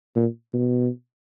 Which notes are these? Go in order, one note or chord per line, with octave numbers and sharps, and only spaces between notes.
A#2
B2